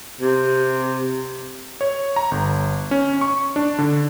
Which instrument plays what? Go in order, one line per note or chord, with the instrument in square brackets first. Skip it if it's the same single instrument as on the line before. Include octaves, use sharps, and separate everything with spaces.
[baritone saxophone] C3
[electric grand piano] C#5
A#5
G1
C#4
C#6
D4
D3